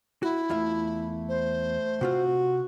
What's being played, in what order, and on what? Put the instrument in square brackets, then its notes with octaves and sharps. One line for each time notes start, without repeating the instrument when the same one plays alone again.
[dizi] E4 [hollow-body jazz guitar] F#4
[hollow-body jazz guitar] E2 F4 E5 [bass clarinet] A3
[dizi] C5
[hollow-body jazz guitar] C3 C4 F4 [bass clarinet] F#4